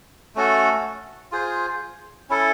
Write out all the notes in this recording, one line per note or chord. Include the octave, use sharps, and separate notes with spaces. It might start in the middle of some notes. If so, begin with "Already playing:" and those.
A3 C#4 F#4 A4
F4 G#4 C5
C#4 E4 A4